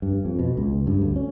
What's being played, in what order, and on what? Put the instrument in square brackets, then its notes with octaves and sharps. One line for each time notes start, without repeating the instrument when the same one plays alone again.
[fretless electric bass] G2
F2
B2
C#2
G2
D2
C#4